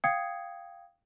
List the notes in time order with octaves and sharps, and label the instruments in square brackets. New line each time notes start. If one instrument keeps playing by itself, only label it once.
[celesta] F5 G5 D#6 G#6 C7 C#7